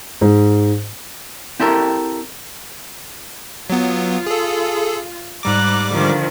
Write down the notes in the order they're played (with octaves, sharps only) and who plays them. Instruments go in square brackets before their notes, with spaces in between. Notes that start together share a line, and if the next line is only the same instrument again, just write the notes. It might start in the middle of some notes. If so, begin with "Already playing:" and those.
[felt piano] G#2
[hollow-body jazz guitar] C4 E4 G4 A4 A#4
[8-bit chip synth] F#3 B3 [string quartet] F4
[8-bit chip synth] G#4 A4
[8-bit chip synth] G#2 G3 D6 [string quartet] A#5 F#6
[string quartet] D3 D#3 F3